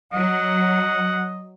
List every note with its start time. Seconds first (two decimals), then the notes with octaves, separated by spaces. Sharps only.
0.13 F#3 D#5 F#5